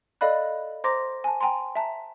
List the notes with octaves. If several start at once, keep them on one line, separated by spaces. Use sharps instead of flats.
A4 D5 D#5 F5 B5 F#6
C5 A#5 C6 D6 A#6
G#5 A5
G5 G#5 A#5 C6
E5 A5 A#5